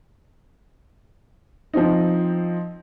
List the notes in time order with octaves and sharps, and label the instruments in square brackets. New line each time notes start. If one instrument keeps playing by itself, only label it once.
[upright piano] F3 C4 D#4